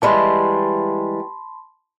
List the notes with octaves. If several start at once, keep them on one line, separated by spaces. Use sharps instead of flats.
E3 G3 G#3 A5 B5 C6